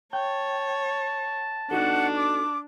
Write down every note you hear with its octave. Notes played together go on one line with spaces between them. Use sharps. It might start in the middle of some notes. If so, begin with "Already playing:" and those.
C#5 G5 A5
D4 D#4 F#4 A4 F#5
D6